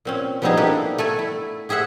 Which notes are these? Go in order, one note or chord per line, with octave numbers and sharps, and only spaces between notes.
A#2 C4 C#4
F3 G3 B3 C4 D#4 G#4
A#3 B3 D4 E4 G4 A4
A3 A4 G#5
E4
G4 G#4 C5 E5 F#5